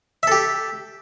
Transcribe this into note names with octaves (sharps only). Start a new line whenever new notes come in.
G4 A4 E5